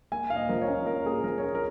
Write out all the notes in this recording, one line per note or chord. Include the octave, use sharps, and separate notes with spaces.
A#3 G#5
A#2 F5
D#5
F3 A#4
C#5
C#4
A#3 A#4
A#2 G#4
F3 A#4
C#5
C#4 A#4
A#4